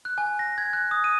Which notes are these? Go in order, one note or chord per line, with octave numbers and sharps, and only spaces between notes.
F#6
G#5
A#6
G#6
F#6
D#6
D#7